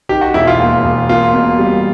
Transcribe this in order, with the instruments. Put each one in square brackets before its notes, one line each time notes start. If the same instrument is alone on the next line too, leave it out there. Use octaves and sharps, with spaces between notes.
[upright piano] D#3 [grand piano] G4
[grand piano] F#4
[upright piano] E1 [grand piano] E4
[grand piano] F4
[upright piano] D#2
E1
[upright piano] A#3 [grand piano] F4
[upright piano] B2
G3